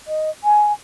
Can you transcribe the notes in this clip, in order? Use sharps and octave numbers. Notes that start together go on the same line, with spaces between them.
D#5
G#5